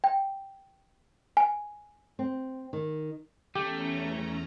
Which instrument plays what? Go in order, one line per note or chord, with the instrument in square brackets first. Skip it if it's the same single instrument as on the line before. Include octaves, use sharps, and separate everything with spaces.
[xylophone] G5
G#5
[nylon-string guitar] C4
D#3
[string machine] E2 C#4 A#5 [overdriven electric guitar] A3 [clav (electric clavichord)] G4